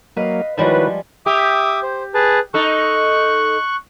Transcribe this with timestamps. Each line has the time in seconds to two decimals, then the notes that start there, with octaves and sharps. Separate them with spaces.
0.17 F#3 A#3 B4 D#5 F5
0.58 D#3 F3 G3 G#3 E4 F#4 B4 C#5
1.26 G4 E5 D6 D#6
1.83 C5
2.14 G#4 B4 A5
2.54 D#4 A4 C#6 F#6